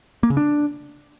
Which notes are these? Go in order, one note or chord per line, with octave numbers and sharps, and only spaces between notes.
A#3
C#3
D4